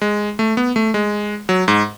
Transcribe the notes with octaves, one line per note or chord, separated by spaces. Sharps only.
G#3
A3
B3
A3
G#3
F#3
G#2